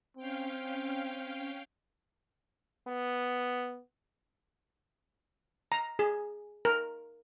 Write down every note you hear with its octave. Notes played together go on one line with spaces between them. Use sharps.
C4 C#4 F5 G5
B3
A#5
G#4
A#4